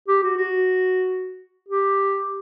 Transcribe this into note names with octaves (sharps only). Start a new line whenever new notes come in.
G4
F#4
F#4
G4